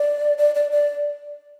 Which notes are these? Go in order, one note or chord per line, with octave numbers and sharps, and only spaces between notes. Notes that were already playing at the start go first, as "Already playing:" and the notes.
Already playing: D5
D5
D5
D5